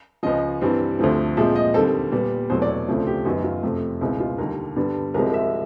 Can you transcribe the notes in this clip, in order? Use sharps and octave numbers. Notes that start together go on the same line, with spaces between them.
C#2 C#3 F3 D#5
G2 E3 G3 C4
D2 D3 F3 A3 C4
A#2 F3 G#3 C4 E5
D#5
D#2 D3 G3 C4 A4
A#2 G3 B3
E2 B2 F#3 A3 C4 C5
D5
C#5
D2 C#3 F3 A3 C4
G4
F#2 D#3 F#3 B3 F#4
F4
F2 C3 F3 A3
C#2 B2 G#3 C4 E4
F4
D#2 D3 G3 A#4
G2 D3 G3 B3
C2 C3 F3 G#3 C4 A#4
E5